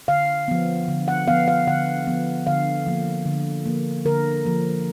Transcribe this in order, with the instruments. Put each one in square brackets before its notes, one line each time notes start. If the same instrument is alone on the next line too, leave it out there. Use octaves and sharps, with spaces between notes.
[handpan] D3 F5
F3 B3
D3
F#5
F3 B3 F5
F5
D3 F#5
F3 B3
D3 F5
F3 A#3
D3
F3 A#3
D3 A#4
F3 A#3